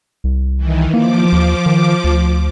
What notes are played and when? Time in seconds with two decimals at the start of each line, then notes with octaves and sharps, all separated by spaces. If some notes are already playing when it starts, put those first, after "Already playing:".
0.24 C2
0.57 D#3 E3
0.94 F3 A#3 D6
1.32 D#2
1.66 D#3
2.04 D2